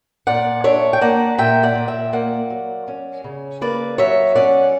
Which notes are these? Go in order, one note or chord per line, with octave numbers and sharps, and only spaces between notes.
A#2 D5 F#5
D4 C#5 E5
G5
A#3 D5 F#5
A#2 E5 G5
D5 F#5
A#2
E5 G5
A#3 D5 F#5
F#3
C#4
C#3
A#3 B4 D5
F#3 C#5 E5
C#4 D5 F#5